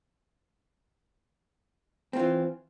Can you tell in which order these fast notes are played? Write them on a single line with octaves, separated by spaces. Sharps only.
C4 F4 E3